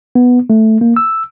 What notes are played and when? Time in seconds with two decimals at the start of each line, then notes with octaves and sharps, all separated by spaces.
0.15 B3
0.50 A3
0.81 A#3
0.96 E6